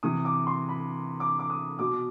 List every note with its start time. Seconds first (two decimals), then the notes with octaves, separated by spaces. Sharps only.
0.03 C3 E3 D#6
0.25 D6
0.47 C6
0.69 B5
1.20 D6
1.39 D6
1.50 D#6
1.79 B2 D6